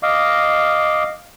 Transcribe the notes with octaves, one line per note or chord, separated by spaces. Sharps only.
D#5 F5 D6